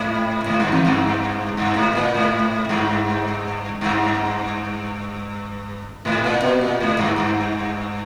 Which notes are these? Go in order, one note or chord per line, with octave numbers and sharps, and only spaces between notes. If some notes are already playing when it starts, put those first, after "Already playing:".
Already playing: G#2
G#2
G2
E2
G2
G2
G#2
A#2
G#2
G2
G2
G#2
A#2
B2
A#2
G#2
G2
G2